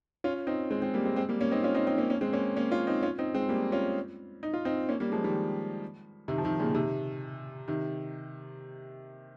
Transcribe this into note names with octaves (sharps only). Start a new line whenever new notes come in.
C#4 F4
C4 D#4
G#3 C4
G#3 C4
G3 A#3
G#3 C4
G#3 C4
G3 A#3
A#3 C#4
C4 D#4
C#4 F4
C4 D#4
C4 D#4
A#3 C#4
A#3 C#4
G#3 C4
A#3 C#4
A#3 C#4
C#4 F4
C4 D#4
C#4 F4
C4 D#4
G#3 C4
G3 A#3
C#4 F4
D#4
F4
C4 D#4
A#3 C#4
G3 A#3
F3 G#3
D#3 G3
C3 D#3
F3
C3 D#3
A#2 C#3
C3 D#3
C3 D#3